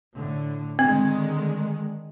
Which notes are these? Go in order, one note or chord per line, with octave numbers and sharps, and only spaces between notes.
A2 D3
D3 D#3 G#3 C4